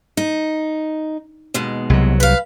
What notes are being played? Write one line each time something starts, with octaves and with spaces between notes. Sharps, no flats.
D#4
D#2 B2 G#3
C2 F#3
B4 F5